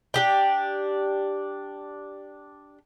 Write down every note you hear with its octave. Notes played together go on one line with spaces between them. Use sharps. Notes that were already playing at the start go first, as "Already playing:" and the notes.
D4 G4 G5